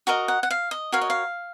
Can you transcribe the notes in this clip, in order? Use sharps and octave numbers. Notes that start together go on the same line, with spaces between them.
F#4 A#4 D#5 A#5
F#5
F#5
F5
D#5
F#4 A#4 C#5 F5
D#5
F5